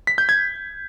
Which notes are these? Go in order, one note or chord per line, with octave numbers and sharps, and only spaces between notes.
B6
G6
G#6